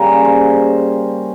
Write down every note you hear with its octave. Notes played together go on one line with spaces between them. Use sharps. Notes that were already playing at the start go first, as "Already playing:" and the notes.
Already playing: C#3 G3 A#3 C#4 A#4
C5